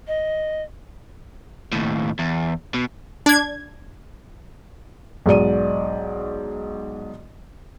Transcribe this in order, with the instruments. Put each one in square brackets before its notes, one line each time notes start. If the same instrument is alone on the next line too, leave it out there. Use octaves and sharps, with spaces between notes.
[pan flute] D#5
[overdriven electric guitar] D#2 A2
E2
B2
[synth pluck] D4 G#6
[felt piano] B1 G#2 D5 D#7